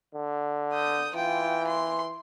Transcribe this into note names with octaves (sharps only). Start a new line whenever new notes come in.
D3
D#6 G6
E3 F4 G5
C6